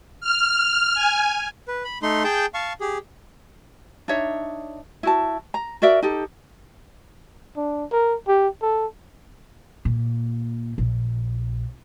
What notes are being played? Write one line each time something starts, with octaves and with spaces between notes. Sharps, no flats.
F6
G#5
B4
B5
A3 D#4 C6
G#4 G5 A5 G6
F5 A5 C#6
G4 G#4
D4 D#4 C#5 E5
E4 F#4 A5
A#5
F#4 A#4 D5 E5
D#4 G4 A4
D4
A#4
G4
A4
A#2
A#1